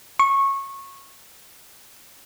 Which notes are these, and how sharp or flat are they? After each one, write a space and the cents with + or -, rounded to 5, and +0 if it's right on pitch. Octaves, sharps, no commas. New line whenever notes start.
C#6 -20